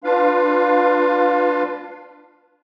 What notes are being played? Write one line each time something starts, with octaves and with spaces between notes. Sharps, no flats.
D4 F4 B4 F5